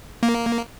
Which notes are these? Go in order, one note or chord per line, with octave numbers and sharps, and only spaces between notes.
A#3